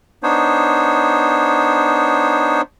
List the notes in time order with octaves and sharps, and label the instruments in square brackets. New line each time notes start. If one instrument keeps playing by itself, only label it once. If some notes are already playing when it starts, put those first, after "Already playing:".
[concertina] B3 D4 D#4 C5 C#5